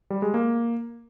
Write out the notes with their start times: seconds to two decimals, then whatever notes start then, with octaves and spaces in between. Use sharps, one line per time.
0.10 G3
0.22 G#3
0.34 A#3